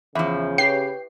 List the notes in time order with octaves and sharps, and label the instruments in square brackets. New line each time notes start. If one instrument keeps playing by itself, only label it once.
[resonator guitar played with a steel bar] E2 F3 [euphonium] C#3 [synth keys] E5
[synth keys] G4 B4 C#5 [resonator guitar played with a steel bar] G5 [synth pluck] C7